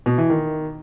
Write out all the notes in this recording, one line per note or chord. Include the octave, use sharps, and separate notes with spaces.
B2
E3
D#3